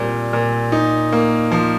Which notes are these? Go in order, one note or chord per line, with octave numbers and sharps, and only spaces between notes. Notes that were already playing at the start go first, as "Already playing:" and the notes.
Already playing: A#2 G3 C4
A#2
D#4
A#3
F3